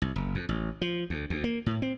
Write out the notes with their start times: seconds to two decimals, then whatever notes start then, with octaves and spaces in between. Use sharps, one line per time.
0.02 C2
0.16 F#1
0.35 F2
0.49 A1
0.81 F3
1.10 D2
1.30 D2
1.44 A#3
1.66 A2
1.82 C4